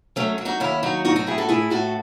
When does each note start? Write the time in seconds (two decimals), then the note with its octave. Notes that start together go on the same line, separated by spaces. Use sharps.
0.16 F#3 A3 C#4
0.38 F#3
0.45 D#4 F#4
0.60 D#2 C#4 E4
0.83 F#3 D#4 F#4
1.05 A2 D#4 F#4
1.16 D#4 F#4
1.26 A2 E4 G#4
1.38 F#4 A4
1.49 A2 E4 G#4
1.70 A2 F#4 A4